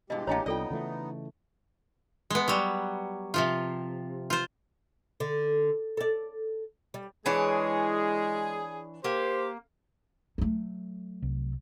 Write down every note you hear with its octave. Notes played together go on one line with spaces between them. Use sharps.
G2 B2 E3 G#3 G4 D#5
A1 A#3 D4 C#5 D#5 G5 A#5
C2 B3 D#4 F4 A4 D5 D#5 G5
C#3 E3 A3
G#3 B3
F#3 G3
C3 F3 F4
F4 C5
D3
A4 D5
G3
E3 G#3 D4 G#4 C#5
A#3 G4 C5
F#3 A3
C2